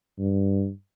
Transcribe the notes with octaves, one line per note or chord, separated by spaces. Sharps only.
G2